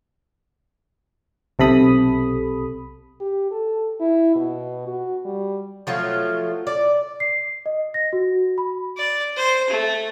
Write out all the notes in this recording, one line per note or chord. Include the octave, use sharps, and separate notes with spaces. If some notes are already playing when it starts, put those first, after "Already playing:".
B1 C3 A4 B5 D#6
G4
A4
E4
B2
F#4
G3
F3 F#3 A3 F4
D5
C7
D#5
A#6
F#4
B5
D5
C5
A3